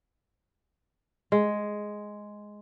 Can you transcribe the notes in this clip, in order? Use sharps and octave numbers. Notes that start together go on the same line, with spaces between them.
G#3